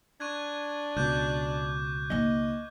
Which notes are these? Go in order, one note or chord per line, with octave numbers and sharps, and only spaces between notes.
D4 C#6 F#6 G#6
C#2 B2 D6 F#6 G6
A#3 D#4 D#5